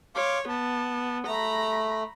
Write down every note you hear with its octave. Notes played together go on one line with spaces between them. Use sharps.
C#5 F5 C6 D6
B3 A5
A3 A#5 B5